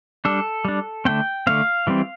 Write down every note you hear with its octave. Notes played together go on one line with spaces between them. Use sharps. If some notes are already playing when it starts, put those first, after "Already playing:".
G3 D4 A4
G3 D4
D3 A3 C4 G5
D3 A3 C4 F5
E3 G3 C4